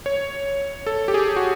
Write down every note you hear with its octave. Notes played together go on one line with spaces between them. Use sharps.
C#5
A4
G4
G#4
F#4